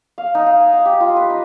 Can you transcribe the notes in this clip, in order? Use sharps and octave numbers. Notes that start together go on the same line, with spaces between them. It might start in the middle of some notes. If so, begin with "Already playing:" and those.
F5
D#4
F5
G#5
F#5
G4
F4
B4
D#4